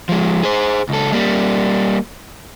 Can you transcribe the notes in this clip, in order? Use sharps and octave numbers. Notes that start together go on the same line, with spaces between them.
F3 G#3
G#4 C5
C#2 A4
G3 A#3